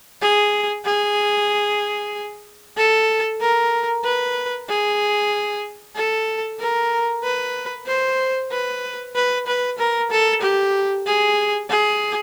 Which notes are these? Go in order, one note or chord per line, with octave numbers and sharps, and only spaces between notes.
G#4
G#4
A4
A#4
B4
G#4
A4
A#4
B4
C5
B4
B4
B4
A#4
A4
G4
G#4
G#4